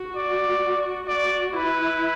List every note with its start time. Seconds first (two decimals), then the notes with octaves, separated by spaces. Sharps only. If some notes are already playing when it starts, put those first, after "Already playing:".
Already playing: F#4
0.16 D5
1.07 F#4 D5
1.53 E4 B4